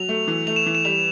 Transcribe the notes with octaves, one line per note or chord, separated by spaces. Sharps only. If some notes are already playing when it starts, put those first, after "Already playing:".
Already playing: F#3 F7
A3
E3
A3 F7
E7
E3
E7
G3 F7